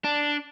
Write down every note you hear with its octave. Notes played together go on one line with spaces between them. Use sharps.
D4